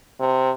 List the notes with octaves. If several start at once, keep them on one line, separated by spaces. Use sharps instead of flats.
C3